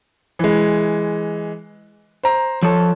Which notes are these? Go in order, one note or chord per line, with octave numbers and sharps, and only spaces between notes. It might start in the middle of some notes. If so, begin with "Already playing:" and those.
E3 G#3
C5 A#5
F3 A4 C#5